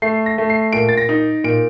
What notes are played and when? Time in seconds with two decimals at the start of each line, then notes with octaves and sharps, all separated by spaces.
0.02 A3 C7
0.26 A#6
0.38 A3
0.50 C7
0.73 A#2 D7
0.89 A6
0.97 A#6
1.09 D#4
1.44 A#2 D7